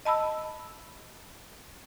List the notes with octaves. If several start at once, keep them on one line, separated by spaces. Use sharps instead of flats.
D#5 A5 B5 E6